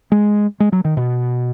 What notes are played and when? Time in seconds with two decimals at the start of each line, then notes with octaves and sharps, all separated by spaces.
0.12 G#3
0.60 G#3
0.72 F#3
0.85 D#3
0.97 B2